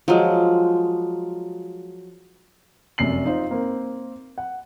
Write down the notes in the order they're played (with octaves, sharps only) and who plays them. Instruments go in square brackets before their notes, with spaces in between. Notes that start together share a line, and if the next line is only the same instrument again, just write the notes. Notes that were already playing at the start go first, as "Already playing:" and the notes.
[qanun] F3 F#3 G#3
[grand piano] F1 F#2 C3 C7 F#7
D#4 F4 C5
A#3 C4
F#5